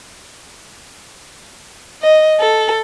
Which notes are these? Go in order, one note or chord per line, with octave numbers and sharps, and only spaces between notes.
D#5
A4